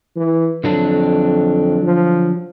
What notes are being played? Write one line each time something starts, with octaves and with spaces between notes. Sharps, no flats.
E3
F2 D3 F#3 D4
F3